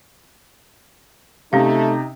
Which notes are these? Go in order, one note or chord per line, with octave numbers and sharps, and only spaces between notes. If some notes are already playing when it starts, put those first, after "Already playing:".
C3 A3 C#4 D#4 F5